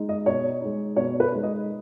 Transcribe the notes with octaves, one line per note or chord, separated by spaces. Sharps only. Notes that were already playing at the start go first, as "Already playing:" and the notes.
Already playing: G#3 D#4
D#5
B2 C#5
G#3 D#4
B2 C#5
B4
G#3 D#4
D#5